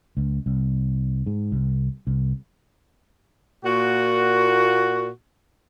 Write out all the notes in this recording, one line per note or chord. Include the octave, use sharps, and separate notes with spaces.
C#2
C2
G#2
C2
C2
A#2 F#4